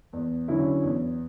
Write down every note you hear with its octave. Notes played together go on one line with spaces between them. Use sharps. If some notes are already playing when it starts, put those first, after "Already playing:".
E2
D3 F#3 C#4 E4
E2